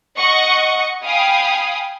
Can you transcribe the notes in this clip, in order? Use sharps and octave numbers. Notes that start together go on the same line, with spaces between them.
D#5 F#5 C#6
F5 G5 G#5 B5 D#6